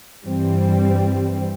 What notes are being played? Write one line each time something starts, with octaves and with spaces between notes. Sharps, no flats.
G2 E3 G3 C4